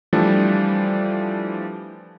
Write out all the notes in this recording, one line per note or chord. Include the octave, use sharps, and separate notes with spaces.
E3 F3 G3 A3 D4